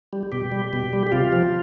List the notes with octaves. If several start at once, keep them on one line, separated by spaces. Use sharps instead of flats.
G3
B2 G4
G3
B2
G3
G4
C3 F4
F3